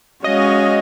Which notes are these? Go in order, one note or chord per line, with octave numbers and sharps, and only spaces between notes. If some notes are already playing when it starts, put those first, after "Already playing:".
G#3 C#4 F#4 C#5 D#5 F5